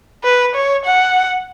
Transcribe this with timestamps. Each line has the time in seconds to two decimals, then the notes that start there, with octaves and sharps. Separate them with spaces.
0.24 B4
0.55 C#5
0.85 F#5